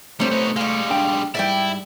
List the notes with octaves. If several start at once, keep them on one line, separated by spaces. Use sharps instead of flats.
C3 G3 A3 C4 C5 C#5
B3 D#4
G3 G#3 F5 C#6
B1 D4 G5
G#2 G3 E4 D5 E5 G5